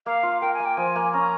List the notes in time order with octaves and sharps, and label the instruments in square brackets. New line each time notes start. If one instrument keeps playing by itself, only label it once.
[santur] A#3 [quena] F5
[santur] F4
[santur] A#4 [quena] G5
[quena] G#5
[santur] A#3
[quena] G5
[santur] F3 [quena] G#5
[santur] A#3
[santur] C#4 [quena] A#5